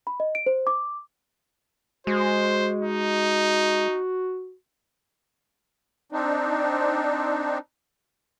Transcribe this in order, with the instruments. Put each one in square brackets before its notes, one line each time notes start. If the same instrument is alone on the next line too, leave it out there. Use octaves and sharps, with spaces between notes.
[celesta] B5
D#5
D7
C5
D6
[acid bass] G#3 [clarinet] F#4 [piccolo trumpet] C5
[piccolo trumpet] D#4
[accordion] C4 D4 D#4